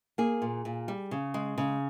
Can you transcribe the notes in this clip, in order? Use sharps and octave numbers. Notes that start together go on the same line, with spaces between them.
A#3 G#4
A#2
A#2
G3
C#3
G#3
C#3